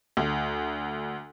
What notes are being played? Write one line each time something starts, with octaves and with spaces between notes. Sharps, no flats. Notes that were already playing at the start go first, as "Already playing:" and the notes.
D2